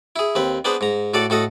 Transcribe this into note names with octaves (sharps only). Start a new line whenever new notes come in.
E4 G#4
D#2 C4 B4
B3 D4 G#4 B4 C5
G#2 A#5
A2 F#4 A4 D5
A2 F#4 A4 D#5